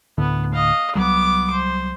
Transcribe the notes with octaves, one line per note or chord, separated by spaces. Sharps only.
D2 A2 D3 B3
D#5 F5
C2 F#3 G3 B3 D6
C5